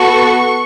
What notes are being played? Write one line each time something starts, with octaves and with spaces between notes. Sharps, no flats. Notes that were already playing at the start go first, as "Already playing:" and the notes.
Already playing: B3 F#4 A4 C#6